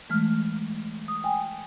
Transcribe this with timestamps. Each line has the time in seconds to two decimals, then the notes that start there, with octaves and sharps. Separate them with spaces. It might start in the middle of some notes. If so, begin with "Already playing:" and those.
0.10 E3 G#3 A3 F6
1.08 D#6
1.24 G5 G#5